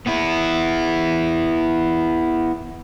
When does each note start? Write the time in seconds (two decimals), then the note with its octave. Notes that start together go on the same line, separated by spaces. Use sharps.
0.06 B3 E4